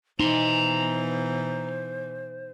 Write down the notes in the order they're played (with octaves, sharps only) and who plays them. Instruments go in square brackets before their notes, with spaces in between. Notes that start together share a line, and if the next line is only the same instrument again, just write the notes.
[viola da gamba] B2 E3 B3 [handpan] D#4 [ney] C5 [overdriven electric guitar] A#5 C6